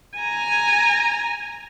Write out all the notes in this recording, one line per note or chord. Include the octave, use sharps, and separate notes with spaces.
G#5 A#5